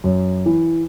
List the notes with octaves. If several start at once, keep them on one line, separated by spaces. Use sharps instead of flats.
F#2
E3